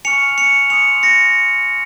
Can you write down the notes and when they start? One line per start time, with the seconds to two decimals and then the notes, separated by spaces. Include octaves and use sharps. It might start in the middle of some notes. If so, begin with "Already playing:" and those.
0.05 G#5 C#6 F6 C#7 F7
0.38 C#7 F7
0.70 G#5 C6 D#6 C#7 F7
1.03 A#6 C#7